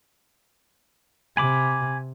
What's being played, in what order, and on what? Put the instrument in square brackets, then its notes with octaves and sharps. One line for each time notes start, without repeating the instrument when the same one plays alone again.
[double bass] C3 [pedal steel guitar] G#5 B5 D6